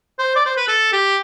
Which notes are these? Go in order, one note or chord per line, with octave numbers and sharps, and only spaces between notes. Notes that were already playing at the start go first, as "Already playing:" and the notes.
C5
D5
C5
B4
A4
G4